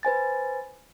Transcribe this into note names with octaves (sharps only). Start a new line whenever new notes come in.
B4 C5 G#5 A6